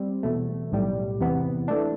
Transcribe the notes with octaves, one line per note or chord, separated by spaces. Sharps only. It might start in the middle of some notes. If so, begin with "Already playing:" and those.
Already playing: G3 C4
E2 B2 A3
B1 A2 G3
E2 C3 E3 B3
E3 A3 D4